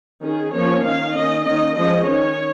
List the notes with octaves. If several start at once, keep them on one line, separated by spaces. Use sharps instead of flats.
D#3 C#4 G#4
F3 A#3 C#4 C#5
D#3 C#4 F5
D#3 A#3 C#4 D#5
D#3 A#3 C#4 D#5
F3 G#3 C#4 D#5
D#3 C#4 C#5